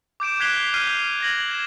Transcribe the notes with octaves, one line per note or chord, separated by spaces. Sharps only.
D6 G6 D7 E7
F#6 G#6 B6 C7 F7 G7
F6 G6 C7 D#7 F7 G7
G#6 A#6 F#7
E7